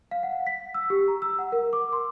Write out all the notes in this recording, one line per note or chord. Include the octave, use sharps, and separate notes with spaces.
F5
F#5
B6
E6
G4
A#5
E6
F#5
A#4
D6
C6